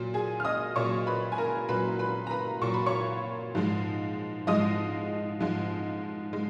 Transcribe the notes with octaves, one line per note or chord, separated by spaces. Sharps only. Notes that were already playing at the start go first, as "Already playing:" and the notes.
Already playing: A#2 F#3
G#4 G#5
F6
D#5 D#6
A#2 F#3 C#5 C#6
B4 B5
G#5
A#4 A#5
A#2 F#3 B4 B5
B4 B5
A#5
B4 B5
A#2 F#3 C#6
B5
C#5 C#6
G#2 F3 G#3
G#2 F3 G#3 D#5 D#6
G#2 F3 G#3
G#3